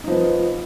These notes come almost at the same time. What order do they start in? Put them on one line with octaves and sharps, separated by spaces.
D#4 F3 B3